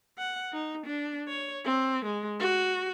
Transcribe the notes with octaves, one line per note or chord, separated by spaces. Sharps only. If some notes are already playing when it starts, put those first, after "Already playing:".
F#5
D#4
D4
C#5
C4
G#3
F#4